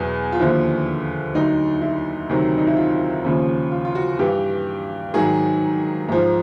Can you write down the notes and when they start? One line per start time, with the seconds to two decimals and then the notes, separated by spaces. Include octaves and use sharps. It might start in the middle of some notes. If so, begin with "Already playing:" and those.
Already playing: E2 B2 F#3
0.32 F4
0.40 D#2 D3 F3 E4
1.34 D2 D3 F#3 D#4
1.82 E4
2.29 D2 C3 D#3 F#3
2.57 D#4
2.67 E4
2.77 F4
3.24 D#2 C#3 F3
3.71 F4
3.85 F4
3.95 F#4
4.19 G2 E3 G4
5.14 G#2 D#3 F#3 G#4
6.09 G#2 F3